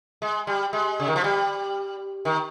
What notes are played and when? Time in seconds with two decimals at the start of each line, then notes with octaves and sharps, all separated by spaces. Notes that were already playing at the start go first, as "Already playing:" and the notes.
0.22 G#3
0.47 G3
0.73 G#3
1.00 C#3
1.08 D#3
1.16 F3
1.24 G3
2.25 D#3